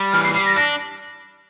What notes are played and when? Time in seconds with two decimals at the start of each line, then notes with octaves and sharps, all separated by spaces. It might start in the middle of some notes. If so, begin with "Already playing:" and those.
Already playing: G3
0.13 E3 F6
0.24 C7
0.34 G3 C7
0.46 A#6
0.56 D4 A#6